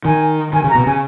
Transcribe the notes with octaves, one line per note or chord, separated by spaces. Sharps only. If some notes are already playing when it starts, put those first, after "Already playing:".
D#3 G#5
D#3 G#5
C#3
A#5
B2
C#3 G#5